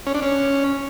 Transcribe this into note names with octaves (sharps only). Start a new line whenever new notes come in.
C#4
D4
C#4